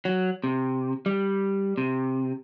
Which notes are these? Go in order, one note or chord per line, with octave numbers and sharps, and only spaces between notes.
F#3
C3
G3
C3